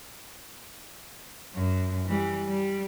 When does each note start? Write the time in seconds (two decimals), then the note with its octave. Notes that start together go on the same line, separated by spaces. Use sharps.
1.55 F#2
2.06 E3 G3
2.49 G3